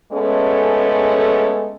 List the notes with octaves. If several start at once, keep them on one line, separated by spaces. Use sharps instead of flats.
G#3 A3 B3 C#4 G#4 A4